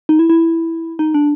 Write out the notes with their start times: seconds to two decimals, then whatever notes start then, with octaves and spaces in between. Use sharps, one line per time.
0.09 D#4
0.19 E4
0.29 E4
0.99 D#4
1.14 D4